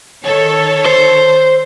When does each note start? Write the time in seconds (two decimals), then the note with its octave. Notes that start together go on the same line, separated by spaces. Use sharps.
0.25 D#3 A4 C#5
0.86 C5